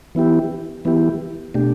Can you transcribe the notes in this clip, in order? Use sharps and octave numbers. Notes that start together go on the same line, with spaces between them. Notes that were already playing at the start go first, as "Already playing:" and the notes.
E3 B3 E4 G4
E3 B3 E4 G4
B2 A3 D4 G4